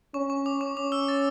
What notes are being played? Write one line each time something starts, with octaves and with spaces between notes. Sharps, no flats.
C#4 C#6
C#6
D6
C#6
C#4 D6
E6
A6